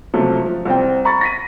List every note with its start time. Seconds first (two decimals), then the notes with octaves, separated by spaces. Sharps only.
0.14 C#2 C3 F3 F#3 A3
0.46 F3
0.65 C2 C4 G5
1.05 A#5 B5 C#6 A6
1.21 A#6 B6 D#7